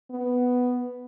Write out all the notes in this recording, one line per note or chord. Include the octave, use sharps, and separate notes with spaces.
B3